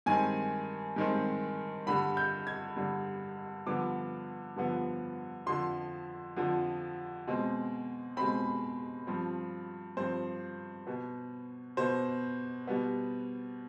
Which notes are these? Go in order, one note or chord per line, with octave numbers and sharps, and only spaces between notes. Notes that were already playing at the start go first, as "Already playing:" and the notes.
G2 D#3 G#3 C4 G#5
G2 D#3 G#3 C4
G2 D3 G3 B5
G6
G#6
G2 D3 G3
G2 D3 F3 B3 D6
G2 D3 F3 B3
F2 D3 F3 C6
F2 D3 F3
B2 G#3 C4
B2 G#3 C4 B5
G2 F3 C4
G2 F3 C4 C5
B2 B3
B2 B3 C5
B2 G3 B3